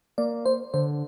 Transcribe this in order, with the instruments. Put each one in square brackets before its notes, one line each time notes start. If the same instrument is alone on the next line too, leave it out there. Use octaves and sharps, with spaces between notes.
[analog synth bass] A#3 [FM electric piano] D5
[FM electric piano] C5
[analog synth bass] D3 [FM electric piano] C5